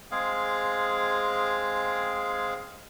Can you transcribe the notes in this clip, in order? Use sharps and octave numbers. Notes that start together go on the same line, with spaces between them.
G#3 C4 G#4 F5